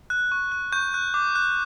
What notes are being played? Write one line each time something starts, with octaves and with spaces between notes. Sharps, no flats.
F#6
C#6
F#6
C#6 G6
F#6
D6
F#6